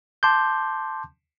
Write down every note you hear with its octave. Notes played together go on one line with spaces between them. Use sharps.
A5 C6 D6 G6